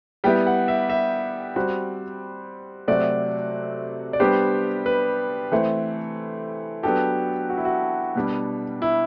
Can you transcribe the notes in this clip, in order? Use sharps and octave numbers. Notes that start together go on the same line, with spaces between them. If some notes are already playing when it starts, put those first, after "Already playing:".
G3 B3 E4 G4 G5
F#5
E5
E5
G3 C4 F#4
C3 F#3 A3 C4 F#4 D5
D5
G3 B3 D4 G4 C5
B4
E3 A3 C4
F#3 B3 D4 F#4 G4 A4
F#4
E4
F#4
B2 G3 D4
E4